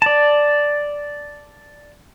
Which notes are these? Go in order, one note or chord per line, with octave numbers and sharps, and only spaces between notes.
D5 A5